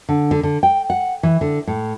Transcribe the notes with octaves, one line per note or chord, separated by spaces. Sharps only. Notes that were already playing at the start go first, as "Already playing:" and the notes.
D3
D3
D3
G5
F#5
E3
D3
A2